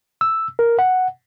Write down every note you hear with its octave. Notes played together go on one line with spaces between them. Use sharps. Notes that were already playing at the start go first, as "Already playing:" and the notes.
E6
A#4
F#5